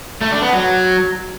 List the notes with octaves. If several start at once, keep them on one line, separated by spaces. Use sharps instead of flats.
A3
D4
B3
F#3